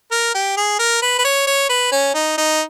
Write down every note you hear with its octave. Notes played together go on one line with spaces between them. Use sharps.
A#4
G4
G#4
A#4
B4
B4
C#5
C#5
B4
C#4
D#4
D#4